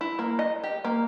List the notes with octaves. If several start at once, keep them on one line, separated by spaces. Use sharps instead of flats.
E4
A#3
D#5
G4
A#3